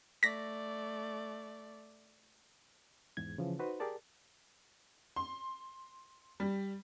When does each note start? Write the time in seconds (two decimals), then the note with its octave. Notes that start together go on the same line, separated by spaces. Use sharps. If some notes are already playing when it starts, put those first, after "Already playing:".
0.23 A3 D5 A#6 B6
3.17 E2 G#2 G#6
3.38 C#3 E3 F3
3.59 D#4 F#4 B4 C5
3.80 G4 G#4 A#4 D5 A5
5.16 C6
6.40 G3